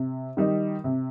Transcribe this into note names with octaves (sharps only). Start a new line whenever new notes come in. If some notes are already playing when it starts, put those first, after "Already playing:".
Already playing: C3
D#3 G3 D#4
C3